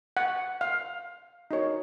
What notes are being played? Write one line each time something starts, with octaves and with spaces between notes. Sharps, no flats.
F#5
F5
D#4 F#4 A#4 C#5